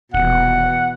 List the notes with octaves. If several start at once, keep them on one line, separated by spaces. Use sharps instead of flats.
D#1 B2 E3 F#5